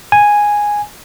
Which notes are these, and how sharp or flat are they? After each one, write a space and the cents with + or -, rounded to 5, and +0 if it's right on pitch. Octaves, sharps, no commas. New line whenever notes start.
G#5 -5